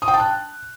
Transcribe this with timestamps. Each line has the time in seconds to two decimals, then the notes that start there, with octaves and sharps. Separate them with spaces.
0.02 D#6
0.08 G5
0.14 A5
0.20 F#6